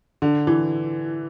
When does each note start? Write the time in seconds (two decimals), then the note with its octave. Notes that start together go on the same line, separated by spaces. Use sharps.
0.22 D3
0.47 E3